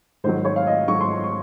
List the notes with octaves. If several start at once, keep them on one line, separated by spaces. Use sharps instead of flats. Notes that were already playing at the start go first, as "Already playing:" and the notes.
G#2 D#3 F#3 C5
C#5
F5
D#5
G#2 D#3 F#3 C#6
C6
C#6
C#6